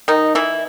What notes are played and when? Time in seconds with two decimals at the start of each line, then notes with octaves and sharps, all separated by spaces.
0.08 D#3 D#4
0.35 E3 E4